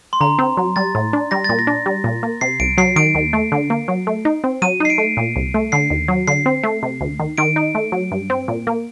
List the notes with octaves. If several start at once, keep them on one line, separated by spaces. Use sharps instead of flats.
C6
D3 A#5
C4
F#3
G3 A6
A2
D4
G3 A#6
A#2 A6
A#6
D4
G3
A#2
A#3
C3 C7
C2 D7
F#3 C7
D#3 D7
D#2
A3
D3
A#3
F#3
A3
D#4
C4
F#3 D#7
D#4 C7
D7
A3
A#2
C2
A3
D3 C7
D#2
F#3
D3 C7
C4
A3
C3
D2
D#3
D#3 D7
D#4
A3
F#3
G2
C4
A#2
A#3